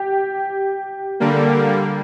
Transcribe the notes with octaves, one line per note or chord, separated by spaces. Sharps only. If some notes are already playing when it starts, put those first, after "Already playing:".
Already playing: G4
D3 G3 A#3